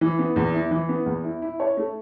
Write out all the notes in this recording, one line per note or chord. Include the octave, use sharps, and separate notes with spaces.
E3
B3
E2
E4
E3
B3
E2
E4
E4
C#5
A3